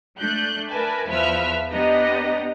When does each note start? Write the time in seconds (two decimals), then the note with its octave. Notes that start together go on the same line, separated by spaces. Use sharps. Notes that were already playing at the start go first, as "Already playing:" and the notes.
0.19 A3 D4 F#6 G6
0.70 A#4 B4 D5 E5 G#5 A5
1.09 E2 F3 B4 E5 F6
1.70 B3 D4 G4 D#5 A#5